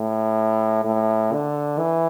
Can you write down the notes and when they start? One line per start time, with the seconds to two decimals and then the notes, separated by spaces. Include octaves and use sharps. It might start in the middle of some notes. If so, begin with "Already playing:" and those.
Already playing: A2
0.85 A2
1.33 D3
1.79 E3